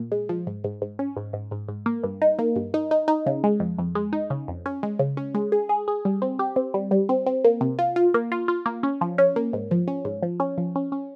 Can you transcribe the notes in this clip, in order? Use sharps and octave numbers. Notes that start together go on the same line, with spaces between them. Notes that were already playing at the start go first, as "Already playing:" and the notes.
Already playing: A#2
G#3
F3
G#2
G#2
G#2
C#4
G#2
G#2
G#2
G#2
A#3
G2
D#4
A#3
G2
D#4
D#4
D#4
C#3
G#3
F2
F2
G#3
D#4
C#3
F2
C#4
G#3
C#3
C#4
G#3
G#4
G#4
G#4
G3
C4
G4
C4
G3
G3
C4
C4
A#3
C3
F4
F4
A#3
F4
F4
A#3
C#4
F3
C#4
A#3
G#2
F3
C#4
G#2
F3
C#4
F3
C#4
C#4